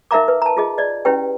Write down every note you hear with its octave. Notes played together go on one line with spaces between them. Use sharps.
D#4 A#4 E5 F5 A#5 D6
B4
A5 A#5
F4 G#4 D#5
D5 D#5
C#4 E4 G4 B4 G5